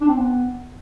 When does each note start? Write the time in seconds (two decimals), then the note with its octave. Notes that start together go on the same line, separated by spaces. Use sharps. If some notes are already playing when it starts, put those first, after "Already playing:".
0.01 D4
0.08 C4
0.16 B3